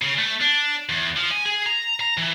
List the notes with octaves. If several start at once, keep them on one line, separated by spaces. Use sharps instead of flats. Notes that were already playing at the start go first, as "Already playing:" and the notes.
C#3
A3
D4
E2
F3
G#5
G#4
A#5
A#5
E3